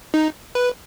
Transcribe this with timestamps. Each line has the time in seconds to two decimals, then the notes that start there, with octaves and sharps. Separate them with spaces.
0.14 D#4
0.55 B4